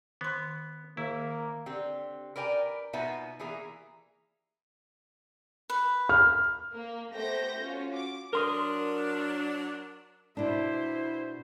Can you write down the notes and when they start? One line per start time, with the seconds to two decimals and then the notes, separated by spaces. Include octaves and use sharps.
0.21 D#3 B3 C6
0.97 D#3 A#3 E4 G#4
1.66 D3 C4 G4
2.36 A#4 B4 D5 G5 G#5 A#5
2.93 B2 B3 D#4 F4 B4 E5
3.40 E3 A#3 G#4 E5 A#5
5.70 B4
6.09 F6
6.74 A#3
7.13 A3 B3 G4 C5 G6 A#6
7.58 C#4 F4 F#4
7.93 D6
8.33 F#3 D4 A#4 C6 D#6
10.37 B2 D4 E4 C5